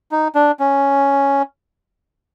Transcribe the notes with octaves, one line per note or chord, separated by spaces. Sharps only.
D#4
D4
C#4